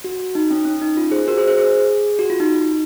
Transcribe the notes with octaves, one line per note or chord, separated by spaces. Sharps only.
F#4
D#4
C#4
C#4
D#4
F4
G#4 C5
F#4 A#4
G#4 C5
G#4 C5
G#4
F#4
F4
D#4